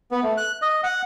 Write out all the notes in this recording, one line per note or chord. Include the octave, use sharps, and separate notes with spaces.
B3
A3
F#6
D#5
F#5